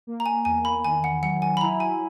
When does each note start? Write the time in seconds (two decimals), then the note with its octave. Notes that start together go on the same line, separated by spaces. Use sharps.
0.07 A#3
0.20 A#5
0.26 G#5
0.45 E2 G#5
0.65 B5
0.84 D#3 G#5
1.04 F#5
1.22 F#3 F#5
1.42 G#5
1.57 B5
1.61 E4 A#5
1.80 G#5